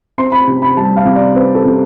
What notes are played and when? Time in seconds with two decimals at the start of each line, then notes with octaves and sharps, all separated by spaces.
0.18 C4 C6
0.32 B5
0.47 C3
0.62 B5
0.77 G3 A5
0.96 F5
1.05 C3
1.15 D5
1.35 C4 B4
1.55 A4
1.65 C3